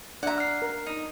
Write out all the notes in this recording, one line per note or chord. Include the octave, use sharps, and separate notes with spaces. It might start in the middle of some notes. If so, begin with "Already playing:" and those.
D4 D5 E5 F#5 A#5
F6 C7
A#4
D#4